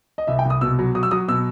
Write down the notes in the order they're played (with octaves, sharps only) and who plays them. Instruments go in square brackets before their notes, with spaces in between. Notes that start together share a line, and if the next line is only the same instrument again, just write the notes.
[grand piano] D#5
C2 E5
G5
C2
D#6
B2 E6
F#3
F#3 D#6
E6
F#3 D#6
B2 E6